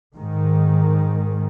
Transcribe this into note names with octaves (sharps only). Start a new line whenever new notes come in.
G#2 D#3